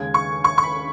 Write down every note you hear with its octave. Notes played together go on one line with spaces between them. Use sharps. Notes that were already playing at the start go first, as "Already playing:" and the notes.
Already playing: D#2 C#3 G#3 G#6
C#6
C#6
C#6
B5